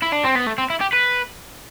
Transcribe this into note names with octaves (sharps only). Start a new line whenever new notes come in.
E4
D4
C4
B3
A3
C4
E4
G4
B4